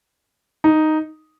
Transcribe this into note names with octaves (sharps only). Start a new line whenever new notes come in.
D#4